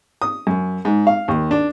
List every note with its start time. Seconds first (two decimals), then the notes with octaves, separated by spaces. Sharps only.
0.22 D#6
0.47 F#2
0.85 G#2
1.07 F5
1.28 D#2
1.51 D4